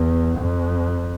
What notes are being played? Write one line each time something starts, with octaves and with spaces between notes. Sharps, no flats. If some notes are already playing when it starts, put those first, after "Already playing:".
Already playing: E2
F2